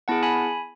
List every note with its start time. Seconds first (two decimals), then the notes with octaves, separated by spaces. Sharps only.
0.08 B3 E4 G#4 F#5 A5
0.23 G#5 B5